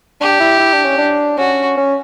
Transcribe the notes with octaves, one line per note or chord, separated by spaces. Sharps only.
D4 G4
E4
E4
D4
C#4
D4
C#4 F#4
C#4